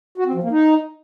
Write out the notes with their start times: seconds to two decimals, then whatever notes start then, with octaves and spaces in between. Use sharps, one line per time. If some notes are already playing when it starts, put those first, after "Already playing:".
0.18 F#4
0.26 C4
0.34 F3
0.43 A#3
0.51 D#4